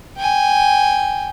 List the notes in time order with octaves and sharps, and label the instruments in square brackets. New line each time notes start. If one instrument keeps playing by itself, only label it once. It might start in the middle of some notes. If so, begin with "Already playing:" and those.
[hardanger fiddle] G5 G#5